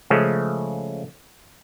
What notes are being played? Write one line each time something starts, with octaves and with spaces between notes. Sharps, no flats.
C#3 F3 G#3 A3 C#4